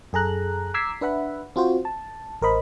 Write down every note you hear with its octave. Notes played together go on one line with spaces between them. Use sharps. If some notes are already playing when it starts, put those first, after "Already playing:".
F#2 G#4 A4 A#5 F#6
A#5 D6 E6 G#6 B6 C7
D4 B4 E5 F#5 B5
C4 F4 F#4 C5
A5
A1 A#4 C5 D#5 B5